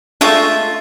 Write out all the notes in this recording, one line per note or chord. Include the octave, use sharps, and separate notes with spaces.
G#3 A3 D4 F4 E5